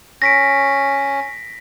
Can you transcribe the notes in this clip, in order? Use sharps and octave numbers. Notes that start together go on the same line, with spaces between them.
C#4 A#6 B6 D7